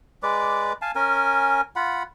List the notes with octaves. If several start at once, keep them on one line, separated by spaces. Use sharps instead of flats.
G#3 B4 D5 D6
F5 G#5 A5
C#4 A#4 G#5
F4 F#5 B5